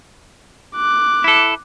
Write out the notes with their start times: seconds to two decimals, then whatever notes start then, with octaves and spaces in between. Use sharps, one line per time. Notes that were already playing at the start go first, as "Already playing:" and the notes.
0.76 D6 F#6
1.24 E4 A4